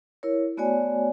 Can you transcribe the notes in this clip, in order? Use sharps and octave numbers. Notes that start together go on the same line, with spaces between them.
E4 A#4 C#5
A3 B3 F#4 C#5 D5 G#5